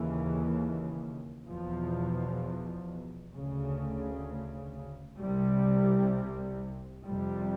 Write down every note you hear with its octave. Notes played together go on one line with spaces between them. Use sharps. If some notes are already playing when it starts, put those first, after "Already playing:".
Already playing: D#2 C#3 E3
E2 B2 F3
D2 C#3
C2 C3 G3
F2 C3 G3